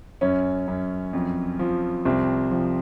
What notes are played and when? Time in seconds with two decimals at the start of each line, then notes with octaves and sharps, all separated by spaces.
0.21 F#2 C#4
0.68 F#2
1.13 F2
1.59 F3
2.05 C2 C4
2.51 F3